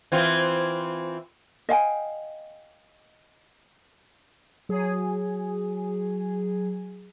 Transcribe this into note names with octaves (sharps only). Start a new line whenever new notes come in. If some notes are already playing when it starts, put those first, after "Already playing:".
E3 C4 F4
D#5 F5 G5 G#5
F#3 G#4